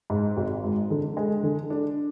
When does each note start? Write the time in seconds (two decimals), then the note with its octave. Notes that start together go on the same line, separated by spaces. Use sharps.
0.10 G#2
0.37 G#1
0.64 G#2
0.90 D3
1.17 G#3
1.43 D3
1.70 D4